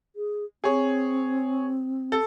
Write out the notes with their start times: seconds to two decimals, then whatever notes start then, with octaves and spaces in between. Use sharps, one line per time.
0.16 G#4
0.64 C4 G#4 C#5
2.12 A4